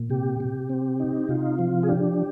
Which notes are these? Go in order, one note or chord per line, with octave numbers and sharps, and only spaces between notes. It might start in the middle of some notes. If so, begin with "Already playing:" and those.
Already playing: A#2
C3 G4
C3
C4
D#4
C3 F4
F3
G#4
D4 G4